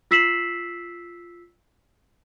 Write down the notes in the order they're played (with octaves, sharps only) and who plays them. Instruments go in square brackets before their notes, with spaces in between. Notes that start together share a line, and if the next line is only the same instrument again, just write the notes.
[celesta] F4 E6 B6 C7 E7 F#7